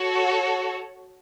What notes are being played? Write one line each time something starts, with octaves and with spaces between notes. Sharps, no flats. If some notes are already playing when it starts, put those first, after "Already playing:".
Already playing: F#4 A4 C#5